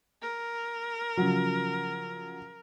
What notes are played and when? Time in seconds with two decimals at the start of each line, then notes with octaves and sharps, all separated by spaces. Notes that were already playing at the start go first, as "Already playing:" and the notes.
0.22 A#4
1.17 C#3 F3 F#3